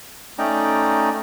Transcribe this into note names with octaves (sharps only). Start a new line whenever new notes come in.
A3 C#4 D#4 D5 G5 A#5